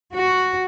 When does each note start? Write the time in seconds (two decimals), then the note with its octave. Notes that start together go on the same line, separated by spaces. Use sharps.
0.13 F#4